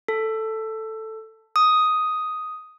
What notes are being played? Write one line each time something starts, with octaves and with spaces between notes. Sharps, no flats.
A4
D#6